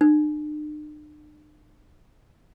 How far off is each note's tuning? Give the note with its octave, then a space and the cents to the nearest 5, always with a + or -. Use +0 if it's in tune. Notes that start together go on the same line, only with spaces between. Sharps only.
D4 +45